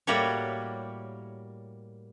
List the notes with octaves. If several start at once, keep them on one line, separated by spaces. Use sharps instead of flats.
A2 G3 A#3 F#4 G4 C#5